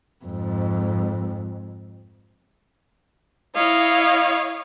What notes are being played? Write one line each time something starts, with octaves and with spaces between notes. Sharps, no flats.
F2 G#2
E4 C#5 D#5 F5